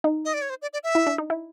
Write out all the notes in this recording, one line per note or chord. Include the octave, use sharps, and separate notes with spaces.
D#4
D#5
D5
C#5
C5
D5
D5
E5
E4
D4
D#4
E4